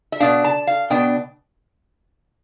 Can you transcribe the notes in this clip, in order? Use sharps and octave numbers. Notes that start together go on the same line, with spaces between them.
E5
B2 B3 D4 F5
A5
F5
B2 B3 D4 G5